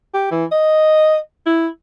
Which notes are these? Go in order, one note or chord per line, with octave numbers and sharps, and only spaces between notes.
G4
E3
D#5
E4